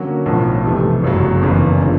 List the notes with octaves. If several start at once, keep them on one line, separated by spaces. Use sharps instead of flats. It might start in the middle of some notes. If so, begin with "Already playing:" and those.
Already playing: D3 F#3 A#3 C#4 F#4
B1 A2 F3
F2 C3 E3 A3
G1 F#2 C#3 F#3
F#1 E2 C#3 E3
D3 F3